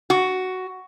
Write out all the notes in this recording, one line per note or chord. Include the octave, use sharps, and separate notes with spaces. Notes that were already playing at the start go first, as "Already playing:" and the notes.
F#4